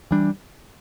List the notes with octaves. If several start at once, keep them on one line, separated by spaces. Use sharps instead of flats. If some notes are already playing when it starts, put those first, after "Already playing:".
E3 G3 D4